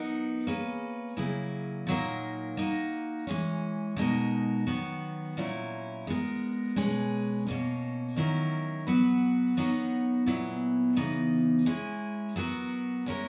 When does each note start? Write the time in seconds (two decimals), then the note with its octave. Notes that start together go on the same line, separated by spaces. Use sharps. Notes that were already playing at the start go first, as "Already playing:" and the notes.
Already playing: F#3 B3 D#4 A#4
0.47 A#3 C#4 G#4 B4
1.17 C#3 F#3 A#3 E4 G#4
1.87 A#2 F#3 A#3 D#4 A#4
2.57 A#3 D#4 F#4
3.27 E3 G#3 C#4
3.96 B2 G#3 D#4 F#4 A#4
4.66 D#3 F#3 B3 F#4
5.37 A#2 F#3 C#4 E4
6.07 G#3 B3 F#4 A#4
6.76 B2 G#3 C#4 G#4 B4
7.47 B2 A#3 C#4
8.16 D#3 F#3 C#4 E4 A#4
8.87 F#3 B3 F#4 B4
9.57 F#3 B3 D#4 F#4 A#4
10.26 A#2 F#3 B3 E4
10.97 C#3 E3 B3 D#4
11.66 G#3 C#4 E4 G#4
12.36 F#3 B3 F#4 A#4
13.06 G#3 C#4 E4 A#4